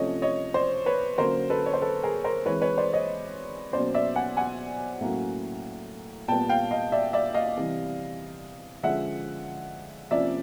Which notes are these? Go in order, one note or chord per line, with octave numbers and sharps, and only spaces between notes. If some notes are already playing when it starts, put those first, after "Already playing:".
Already playing: C3 F3 A3 C#4 C#5 D#5
C#5 D#5
C5 D5
B4 C#5
D3 F#3 A#3 C#4 A#4 C5
A4 B4
C#5
C5
A4 B4
G#4 A#4
A#4 C5
E3 G#3 C4 B4 C#5
B4 C#5
C5 D5
C#5 D#5
B2 F#3 A#3 C#4 C5 D5
D5 E5
F#5 G#5
F#5 G#5
A2 F#3 A#3 C#4
A#2 G3 B3 G5 A5
F5 G5
D#5 F5
D5 E5
D5 E5
D#5 F5
C3 E3 G3
D3 F3 G#3 C#4 E5 F#5
C3 F3 A#3 C#4 D5 E5